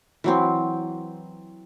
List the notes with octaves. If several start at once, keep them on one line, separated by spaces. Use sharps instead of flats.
E3 F#3 C4